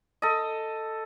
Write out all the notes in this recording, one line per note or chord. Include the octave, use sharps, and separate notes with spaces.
A4 D#5